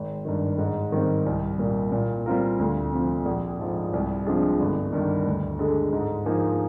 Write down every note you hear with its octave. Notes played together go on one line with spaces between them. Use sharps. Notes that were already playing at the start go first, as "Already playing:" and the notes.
Already playing: G#1
G2 D#3
G#2
D#3 G3 C4
C2
A#2 G3 A#3
A#2
G3 C4 F4 A#4
D2
C3 F3
A#1
G#2 F3
C2
C3 F3 G#3 D4
G1
G2 D#3
D2
D3 G#3
G#2
F3 A#3 D#4 G#4